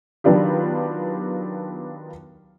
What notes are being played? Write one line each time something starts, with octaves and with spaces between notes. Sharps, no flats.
D#3 F#3 B3 D4 F4 G4